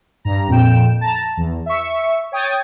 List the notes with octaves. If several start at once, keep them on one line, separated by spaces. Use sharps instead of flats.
G2 A#5
F2 A#2 G5 E7
A5 A#5
E2
E5 C#6
C#5 G5 D#6 G#6 A6